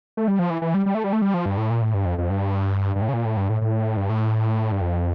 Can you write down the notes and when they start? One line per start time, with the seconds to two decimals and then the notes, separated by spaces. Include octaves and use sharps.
0.17 A3
0.28 G3
0.39 F3
0.50 E3
0.62 E3
0.74 G3
0.86 G3
0.95 A3
1.04 G3
1.13 A3
1.22 G3
1.34 F3
1.46 G2
1.58 A2
1.70 A#2
1.82 A2
1.94 G2
2.05 F2
2.18 F2
2.30 G2
2.96 G2
3.02 A2
3.09 C#3
3.13 A#2
3.25 A2
3.37 G2
3.50 A2
3.62 A2
3.97 G2
4.09 A2
4.72 G2
4.81 F2